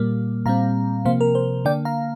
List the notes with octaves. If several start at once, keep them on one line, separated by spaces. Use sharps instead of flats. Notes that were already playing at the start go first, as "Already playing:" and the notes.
Already playing: A#2 G3 A#3
A#2 G3 C4 F5 A#5
C3 F3 A#3 C5 F5
A#4
C5
D3 A#3 D5 G5
F5 A#5